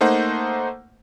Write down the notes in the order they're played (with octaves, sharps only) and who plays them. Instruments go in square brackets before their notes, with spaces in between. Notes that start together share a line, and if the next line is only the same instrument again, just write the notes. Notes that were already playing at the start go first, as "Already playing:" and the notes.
[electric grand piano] A3 A#3 D#4 C5 F#5